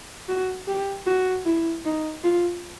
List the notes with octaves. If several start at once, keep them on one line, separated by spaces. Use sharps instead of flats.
F#4
G4
F#4
E4
D#4
F4